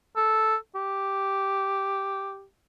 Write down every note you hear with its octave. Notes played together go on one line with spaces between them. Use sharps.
A4
G4